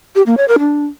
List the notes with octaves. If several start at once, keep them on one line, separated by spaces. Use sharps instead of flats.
G4
A#3
C#5
A#4
D4